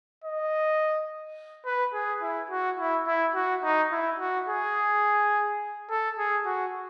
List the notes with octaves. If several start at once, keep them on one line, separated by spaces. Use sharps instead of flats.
D#5
B4
G#4
E4
F#4
E4
E4
F#4
D#4
E4
F#4
G#4
A4
G#4
F#4